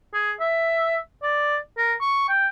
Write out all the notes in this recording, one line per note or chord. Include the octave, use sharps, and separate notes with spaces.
G#4
E5
D5
A#4
C#6
G5